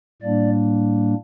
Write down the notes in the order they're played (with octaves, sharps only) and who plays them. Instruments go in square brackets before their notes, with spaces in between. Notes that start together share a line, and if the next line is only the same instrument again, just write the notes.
[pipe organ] A2 G3 A#3 D4 D5